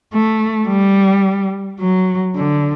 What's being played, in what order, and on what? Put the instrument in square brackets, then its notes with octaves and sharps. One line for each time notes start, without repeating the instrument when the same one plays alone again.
[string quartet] A3
G3
F#3
D3